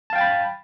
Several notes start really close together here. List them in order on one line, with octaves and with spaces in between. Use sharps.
A5 F5 G5 A6 B5